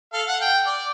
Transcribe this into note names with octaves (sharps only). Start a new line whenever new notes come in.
A4 F5
F#5
G5
D5